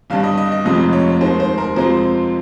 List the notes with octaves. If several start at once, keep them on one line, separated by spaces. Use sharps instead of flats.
G1 G2 G3 F5
D#5
D#5
D#5
F1 F2 C3 F3 G#3 D#5
C#5
D#2 D#3 G#3 C5
C5
A#4
F2 C3 F3 G#3 C5